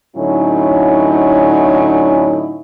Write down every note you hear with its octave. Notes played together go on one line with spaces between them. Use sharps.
A2 D3 F#3 C#4 D#4 E4